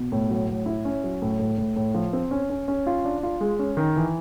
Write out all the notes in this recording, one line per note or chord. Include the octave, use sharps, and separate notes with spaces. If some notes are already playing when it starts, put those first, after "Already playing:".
Already playing: B2
A2
F#3
A2
E4
C#4
F#3
A2
A2
A2
A2
F3
C4
C#4
C#4
C#4
F4
D4
F4
G#3
C#4
D#3
E3